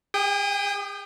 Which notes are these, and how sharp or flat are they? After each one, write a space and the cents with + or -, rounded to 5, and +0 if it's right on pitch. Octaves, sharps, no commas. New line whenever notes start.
G#4 -45 G5 +0 D#6 +0